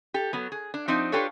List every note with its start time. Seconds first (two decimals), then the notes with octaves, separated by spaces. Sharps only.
0.14 G4 A4
0.33 F#3 B3
0.52 G#4
0.74 D4
0.88 F3 C4 D4 D#4
1.12 D4 F4 G4 A4 B4 C#5